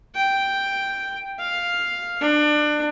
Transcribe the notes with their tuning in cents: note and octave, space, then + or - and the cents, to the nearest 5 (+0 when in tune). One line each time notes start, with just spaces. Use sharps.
G5 +0
F5 +5
D4 +25